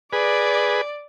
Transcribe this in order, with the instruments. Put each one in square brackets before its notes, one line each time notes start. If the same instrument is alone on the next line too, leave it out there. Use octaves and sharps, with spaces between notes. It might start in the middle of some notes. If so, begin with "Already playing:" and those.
[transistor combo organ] G#4 B4 [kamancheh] D5